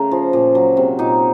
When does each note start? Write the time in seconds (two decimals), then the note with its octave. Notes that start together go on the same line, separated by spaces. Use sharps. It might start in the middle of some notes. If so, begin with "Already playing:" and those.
Already playing: C#3 A3 A#4
0.11 F3
0.33 A#2
0.55 F#3
0.77 C3
0.99 A#2 D#4